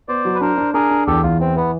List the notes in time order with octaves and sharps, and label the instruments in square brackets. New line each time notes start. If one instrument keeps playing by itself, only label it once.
[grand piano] B3 [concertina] C5 D5
[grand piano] F#3
[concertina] B4
[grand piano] D4 [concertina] A#4 C5
[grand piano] D4
[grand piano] D4 [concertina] G#4 A#4
[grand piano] D4
[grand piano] E2 [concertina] G4 A4
[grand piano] E2 [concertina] F4
[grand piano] E3 [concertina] C4
[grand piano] E3 [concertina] B3